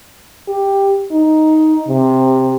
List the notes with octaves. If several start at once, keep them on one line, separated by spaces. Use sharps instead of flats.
G4
D#4
C3